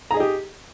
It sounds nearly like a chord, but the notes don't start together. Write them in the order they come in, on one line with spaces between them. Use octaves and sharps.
A#5 G#4 D#5 G4